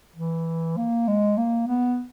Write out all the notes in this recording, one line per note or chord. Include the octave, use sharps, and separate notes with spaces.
E3
A#3
G#3
A#3
B3